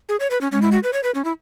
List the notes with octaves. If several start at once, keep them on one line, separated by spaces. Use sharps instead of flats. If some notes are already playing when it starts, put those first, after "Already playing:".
G#4
C#5
B4
C#4
G#3 C#4
E4
F#4
B4
C#5
B4
C#4
E4